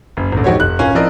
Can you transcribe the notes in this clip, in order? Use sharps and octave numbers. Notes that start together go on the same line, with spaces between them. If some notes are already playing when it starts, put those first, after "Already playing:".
F#1
A1 D2
F2 G#2 F#4 G4 C5 C#5
F1 F#6
D1 C#4 F4 A#4 G#5
F3 C4 E4 A#4 D5 D#5